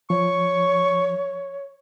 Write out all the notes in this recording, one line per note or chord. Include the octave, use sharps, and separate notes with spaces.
F3 C#5 C#6